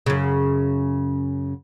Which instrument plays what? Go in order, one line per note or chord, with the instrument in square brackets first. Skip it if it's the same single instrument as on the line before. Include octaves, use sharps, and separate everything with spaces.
[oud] F#2 C#3